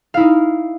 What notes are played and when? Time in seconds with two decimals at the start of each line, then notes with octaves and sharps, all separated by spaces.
0.14 F5
0.17 E4
0.20 D#4